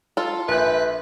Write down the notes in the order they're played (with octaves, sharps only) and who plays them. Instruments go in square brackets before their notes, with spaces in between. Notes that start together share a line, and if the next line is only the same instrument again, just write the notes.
[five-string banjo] F4 A4
[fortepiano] A#1 F#6 [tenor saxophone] B4 [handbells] E5 G6